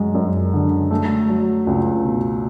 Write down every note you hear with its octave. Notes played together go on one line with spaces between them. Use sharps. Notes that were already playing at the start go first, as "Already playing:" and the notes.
Already playing: F#2 G#3
F#2
D3
A3
F#3
C#2
B2